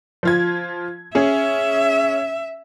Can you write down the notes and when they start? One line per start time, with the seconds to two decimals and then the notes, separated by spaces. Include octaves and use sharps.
0.23 F3 F4 G#6
1.15 C#4 G#4 E5